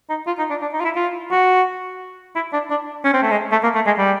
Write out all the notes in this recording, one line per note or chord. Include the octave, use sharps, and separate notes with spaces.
D#4
F4
D#4
D4
D4
D#4
F4
E4
F4
F#4
E4
D4
D4
C#4
C4
A3
G#3
A3
A#3
A3
G#3
G3